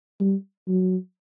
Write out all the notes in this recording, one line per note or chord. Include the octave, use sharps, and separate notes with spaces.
G3
F#3